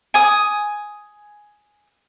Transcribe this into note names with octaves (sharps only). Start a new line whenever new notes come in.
G#5 D#6